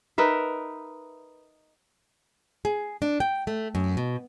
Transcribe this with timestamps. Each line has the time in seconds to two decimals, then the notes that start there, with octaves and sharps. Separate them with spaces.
0.18 D#4 A#4 B4 E5
2.65 G#4
3.02 D4
3.20 G5
3.47 A3
3.75 F#2
3.97 B2